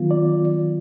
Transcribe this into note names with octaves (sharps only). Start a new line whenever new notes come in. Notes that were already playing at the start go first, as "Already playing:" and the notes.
Already playing: D#3 F#3 B3 F4
D5